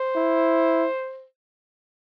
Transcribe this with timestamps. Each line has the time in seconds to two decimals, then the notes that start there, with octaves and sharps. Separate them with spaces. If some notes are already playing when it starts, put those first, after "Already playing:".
Already playing: C5
0.16 E4